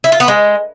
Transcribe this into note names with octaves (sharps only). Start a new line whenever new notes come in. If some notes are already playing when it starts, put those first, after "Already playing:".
E4
F4
B3
G#3